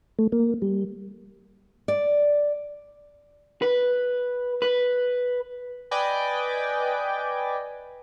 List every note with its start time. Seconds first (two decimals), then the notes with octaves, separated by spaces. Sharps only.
0.19 A3
0.32 A#3
0.62 G3
1.88 D5
3.62 B4
4.62 B4
5.91 B4 D5 D#5 G5 G#5 D6